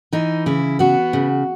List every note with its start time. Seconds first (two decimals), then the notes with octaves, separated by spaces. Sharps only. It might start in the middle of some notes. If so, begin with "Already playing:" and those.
0.13 E3 D#4
0.46 C#3 E4
0.79 B3 F#4
1.13 C#3